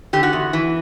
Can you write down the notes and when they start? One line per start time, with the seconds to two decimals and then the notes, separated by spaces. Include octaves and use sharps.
0.13 D3 G4
0.23 F#4
0.33 E2
0.53 E3